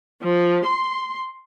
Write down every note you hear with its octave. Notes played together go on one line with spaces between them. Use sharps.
F3
C6